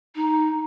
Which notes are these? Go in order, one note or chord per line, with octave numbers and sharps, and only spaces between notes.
D#4